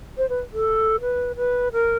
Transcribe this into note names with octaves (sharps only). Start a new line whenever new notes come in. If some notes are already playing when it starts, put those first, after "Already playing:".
C5
B4
A4
B4
B4
A#4